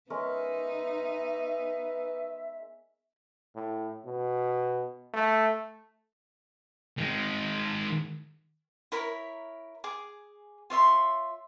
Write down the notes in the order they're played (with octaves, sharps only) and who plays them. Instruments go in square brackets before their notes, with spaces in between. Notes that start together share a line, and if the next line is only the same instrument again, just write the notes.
[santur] G#3 C#4 A#4 [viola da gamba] B3 D#4 [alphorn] B4 [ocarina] E5
[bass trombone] A2
B2
A3
[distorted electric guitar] D#3 G#3
[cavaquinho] E4 A#4 C#5 B5
G#4 D6
F4 C#5 E5 C6